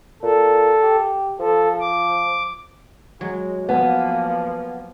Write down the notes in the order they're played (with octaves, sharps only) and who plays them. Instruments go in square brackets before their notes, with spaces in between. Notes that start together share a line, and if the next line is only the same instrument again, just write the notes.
[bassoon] A#2 [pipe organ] A4
[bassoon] G4
[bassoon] F3 [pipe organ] A4
[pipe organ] D6
[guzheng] F#3 [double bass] G#3
[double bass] F3 A#3 [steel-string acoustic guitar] B3 G#5 [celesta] F#5